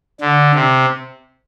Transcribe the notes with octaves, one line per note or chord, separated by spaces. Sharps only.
D3
C3